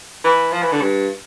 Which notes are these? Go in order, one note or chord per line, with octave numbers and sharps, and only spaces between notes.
E3
F3
E3
D3
G2